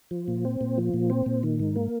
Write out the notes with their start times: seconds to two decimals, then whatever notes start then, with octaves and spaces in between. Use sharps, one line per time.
0.11 F3
0.28 A#2
0.45 C4
0.61 A#2
0.78 F3
0.94 A#2
1.10 C4
1.26 A#2
1.43 D#3
1.60 G#2
1.76 A#3